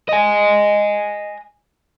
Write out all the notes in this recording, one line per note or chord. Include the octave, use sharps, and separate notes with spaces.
D#5 G#5